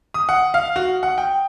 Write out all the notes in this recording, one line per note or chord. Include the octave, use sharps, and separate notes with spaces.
D#6
F#5
F5
F#4
F#5
G5